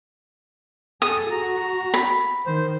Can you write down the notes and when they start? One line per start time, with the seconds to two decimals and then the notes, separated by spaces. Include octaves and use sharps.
1.02 G#4 A4 D#6
1.31 F#4 A#5
1.94 B5
2.46 D#3 C5